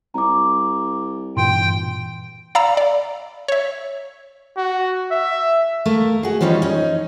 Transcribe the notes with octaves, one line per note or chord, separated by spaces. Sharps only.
C2 A#5 D6
G2 A#2 E3 G5 C6
D5 F5 A#5 B5 E6
D5
C#5 E5
F#4
E5
A3 A#3 A#4
F#4 G#4
E3 F3 G3 C#4 D#4
C#4 D#4